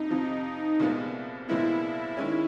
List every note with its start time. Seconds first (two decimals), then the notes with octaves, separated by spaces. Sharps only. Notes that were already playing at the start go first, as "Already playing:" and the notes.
Already playing: F2 C3 D#4
0.10 F2 C3 F3
0.80 C2 A#2 F3 G#3 B3
1.48 C2 A#2 F3 G#3 B3 E4
2.17 D#3 G#3 C#4